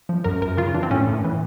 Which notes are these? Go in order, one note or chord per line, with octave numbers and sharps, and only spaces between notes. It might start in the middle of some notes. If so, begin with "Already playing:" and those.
F3
F#2 A#4
F#2 A#4
C#3 F4
E3 D4
C4
A2 C#4
A2
E3